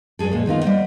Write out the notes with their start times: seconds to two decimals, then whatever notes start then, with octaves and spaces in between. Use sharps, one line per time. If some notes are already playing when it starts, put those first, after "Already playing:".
0.19 G2 F#3 F4 G#4 A4
0.31 F2 A#2 G#3
0.46 D#3 B3 D#4 F4
0.62 G3 C5 D#5 F#5